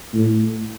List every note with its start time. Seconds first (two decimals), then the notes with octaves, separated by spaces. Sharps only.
0.13 A2